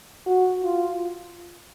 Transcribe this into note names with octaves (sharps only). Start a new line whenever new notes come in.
F#4
F4